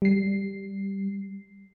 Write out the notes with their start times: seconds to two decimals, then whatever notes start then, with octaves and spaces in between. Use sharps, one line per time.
0.02 G3 C7